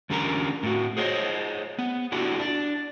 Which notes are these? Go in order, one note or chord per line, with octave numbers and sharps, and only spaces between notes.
E2 D3 C#4 G4 A#4 A#5
A2 F#4
G#4 C5 C#5 D#5
B3
D4 E4 F#4 G4
D4